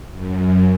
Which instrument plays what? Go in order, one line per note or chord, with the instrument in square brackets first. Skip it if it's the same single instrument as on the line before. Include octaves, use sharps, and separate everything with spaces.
[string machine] F#2